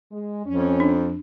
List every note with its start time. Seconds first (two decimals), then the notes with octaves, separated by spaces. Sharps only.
0.11 G#3
0.46 F2 C#4
0.80 D4